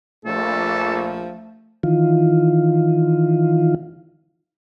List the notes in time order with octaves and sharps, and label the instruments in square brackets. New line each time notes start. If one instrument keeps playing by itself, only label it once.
[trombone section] A#1 [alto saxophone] F3 [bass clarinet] A3 [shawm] A4
[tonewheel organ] D#3 E3 F4